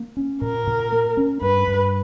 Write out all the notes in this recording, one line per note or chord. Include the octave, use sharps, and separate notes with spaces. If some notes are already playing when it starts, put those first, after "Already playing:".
Already playing: A#3
C#4
A#2 A#4
A#2
A#3
C#4
G2 B4
G2